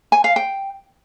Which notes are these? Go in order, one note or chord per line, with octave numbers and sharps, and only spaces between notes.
G#5
F5
G5